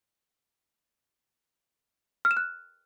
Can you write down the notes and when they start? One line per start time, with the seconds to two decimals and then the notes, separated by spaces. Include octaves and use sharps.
2.25 F6
2.31 E7
2.37 F#6